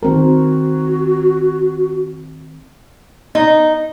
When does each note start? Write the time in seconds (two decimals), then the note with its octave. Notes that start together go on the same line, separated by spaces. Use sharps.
0.03 D#3 C4 F#4 A#4
3.35 D#4